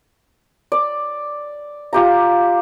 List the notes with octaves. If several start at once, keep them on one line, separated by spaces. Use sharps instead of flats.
D5
F4 G4 A#5